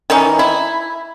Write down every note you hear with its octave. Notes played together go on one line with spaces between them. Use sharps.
D#3 E3 C#4 D#4
E4